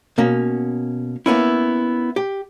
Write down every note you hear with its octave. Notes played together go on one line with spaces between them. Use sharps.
B2 A#3 C#4
A#3 B3 C#4 E4
G4